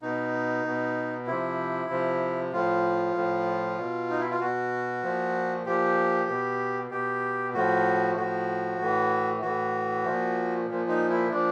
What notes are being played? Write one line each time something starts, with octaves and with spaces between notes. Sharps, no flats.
B2 D#4
B2
C3 F3 E4
C3 F3
A2 F3 F4
A2 F3
B2
D#4
E4
F4
B2 F#4
A#2 F3
A#2 F3 G4
B2
B2 G4
A2 F3 F#4
A2 F3 F#4
A2 E3
A2 E3 F#4
A#2 F3
A#2 F3
D#4
E4
A#2 F3 D4